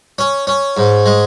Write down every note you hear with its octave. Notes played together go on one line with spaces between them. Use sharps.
C#4
C#4
G#2
G#3